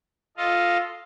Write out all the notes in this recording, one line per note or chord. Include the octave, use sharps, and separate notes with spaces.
F4 A4 D#5 F5